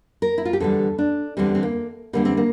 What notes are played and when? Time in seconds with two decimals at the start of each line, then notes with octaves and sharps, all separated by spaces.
0.22 A#4
0.38 E4
0.45 F4
0.53 G4
0.60 E2 D3 G3 A4
0.98 D4
1.37 E2 D3 G3 C4
1.55 C4
1.63 A#3
2.13 E2 D3 G3 A#3
2.25 C4
2.37 A#3